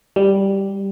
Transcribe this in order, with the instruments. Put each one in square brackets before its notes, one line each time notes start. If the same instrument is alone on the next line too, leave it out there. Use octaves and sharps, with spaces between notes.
[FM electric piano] G3